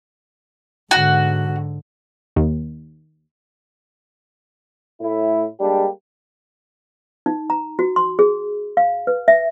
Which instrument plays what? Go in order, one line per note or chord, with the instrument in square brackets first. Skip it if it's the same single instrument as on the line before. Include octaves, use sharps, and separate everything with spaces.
[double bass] G#2 D3 [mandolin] F#4
[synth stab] D#2
[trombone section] A2 E4
G3 G#3 A#3 D4 G4
[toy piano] D#4
A#5
F#4
C6
G#4
F5
B4
E5